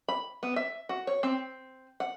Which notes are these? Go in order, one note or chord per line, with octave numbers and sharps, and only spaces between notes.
B5
B3
E5
F#4
C#5
C4
F#5